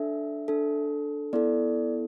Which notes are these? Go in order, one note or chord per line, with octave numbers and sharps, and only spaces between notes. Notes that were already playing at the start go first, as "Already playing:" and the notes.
Already playing: D4 A4 E5
D4 A4
B3 E4 A4 D5